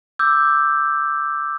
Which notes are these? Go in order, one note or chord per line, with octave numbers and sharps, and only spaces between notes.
D6 E6 G6